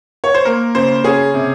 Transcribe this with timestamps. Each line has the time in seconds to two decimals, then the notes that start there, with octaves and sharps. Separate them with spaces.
0.24 C#5
0.34 C5
0.45 A#3 A#4
0.75 C#3 C5
1.04 C#4 G#4
1.34 C3